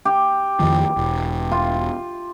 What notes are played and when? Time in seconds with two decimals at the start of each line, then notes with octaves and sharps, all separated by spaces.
0.05 G4
0.60 F2 D#3 F3
0.97 E1
1.51 F4